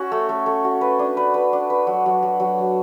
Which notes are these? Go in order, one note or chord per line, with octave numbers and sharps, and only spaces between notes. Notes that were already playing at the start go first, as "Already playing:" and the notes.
Already playing: C#4 F#4
A3
A3
A3
F#4
B4
D4
B4
B4
D4
B4
F#3
F#3
F#3
F#3
F#3